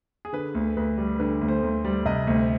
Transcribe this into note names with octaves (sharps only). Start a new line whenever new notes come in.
G#4
D3 B4
D2
D2 B4
G3
D3 B4
D2
C5
D2
G3
C3 D#5
D2